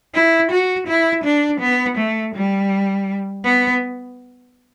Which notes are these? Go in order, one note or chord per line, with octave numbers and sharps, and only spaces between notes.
E4
F#4
E4
D4
B3
A3
G3
B3